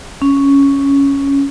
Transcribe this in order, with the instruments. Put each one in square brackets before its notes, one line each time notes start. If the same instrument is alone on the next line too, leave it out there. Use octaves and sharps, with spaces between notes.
[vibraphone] C#4